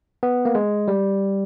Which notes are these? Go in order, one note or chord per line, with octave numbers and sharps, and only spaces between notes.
B3
A#3
G#3
G3